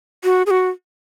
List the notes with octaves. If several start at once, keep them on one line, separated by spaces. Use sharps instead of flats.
F#4
G#4
F#4